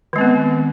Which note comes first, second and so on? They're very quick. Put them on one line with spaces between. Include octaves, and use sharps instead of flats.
D#3 G#3 C4 B3